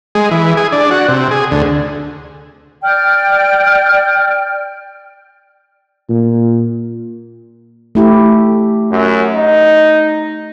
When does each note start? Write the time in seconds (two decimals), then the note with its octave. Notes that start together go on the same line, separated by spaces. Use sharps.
0.15 G#3
0.31 E3
0.57 G#4
0.72 D4
0.91 F#4
1.08 C3
1.31 G#4
1.51 D2
2.83 D5 G5 F6
6.09 A#2
7.95 A3 E4 G4
8.92 F#2
9.35 D#4